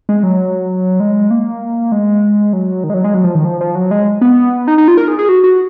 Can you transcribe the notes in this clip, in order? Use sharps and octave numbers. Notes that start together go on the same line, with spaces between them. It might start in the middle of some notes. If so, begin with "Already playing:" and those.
G#3
F#3
G#3
A#3
G#3
F#3
D#3
G#3
F#3
G#3
F#3
F3
D#3
F3
F3
F#3
G#3
B3
D#4
D#4
F4
A#4
G#4
G#4
F#4
F#4